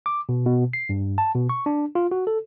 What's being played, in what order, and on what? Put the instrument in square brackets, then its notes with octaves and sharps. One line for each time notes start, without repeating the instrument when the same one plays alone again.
[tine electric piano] D6
B2
B2
C7
G2
A5
B2
C#6
D4
F4
F#4
A4